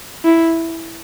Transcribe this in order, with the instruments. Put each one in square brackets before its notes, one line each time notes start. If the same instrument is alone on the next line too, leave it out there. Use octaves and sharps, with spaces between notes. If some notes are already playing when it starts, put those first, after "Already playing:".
[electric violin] E4